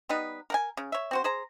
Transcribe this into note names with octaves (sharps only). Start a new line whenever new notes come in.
G3 B3 D#4 B4
A#4 F#5 G#5
C#3
C#5 E5
C4 F#4 C5
G#4 C5 A#5